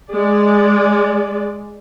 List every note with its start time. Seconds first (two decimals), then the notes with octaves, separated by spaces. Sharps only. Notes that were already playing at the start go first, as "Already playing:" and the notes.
0.13 G#3 D5